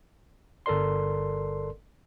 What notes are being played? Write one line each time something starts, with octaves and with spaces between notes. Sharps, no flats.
G1 A4 A#4 D5 C6